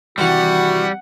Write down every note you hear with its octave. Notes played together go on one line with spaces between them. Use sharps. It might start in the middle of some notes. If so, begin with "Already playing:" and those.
C3 D#3 E3 G3 F#4 F#5